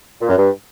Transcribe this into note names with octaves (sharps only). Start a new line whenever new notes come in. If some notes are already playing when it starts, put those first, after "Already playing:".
A#2
F#2
G2